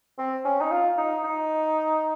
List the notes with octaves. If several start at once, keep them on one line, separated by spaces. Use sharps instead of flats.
C4
C#4
D#4
F4
D#4
D#4